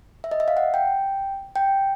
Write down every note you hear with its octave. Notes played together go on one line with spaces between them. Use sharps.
E5
D#5
E5
F5
F#5
G5
G5